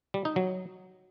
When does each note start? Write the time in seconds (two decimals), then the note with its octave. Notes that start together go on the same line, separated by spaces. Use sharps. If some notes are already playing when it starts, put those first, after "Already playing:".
0.14 G3
0.25 D#4
0.36 F#3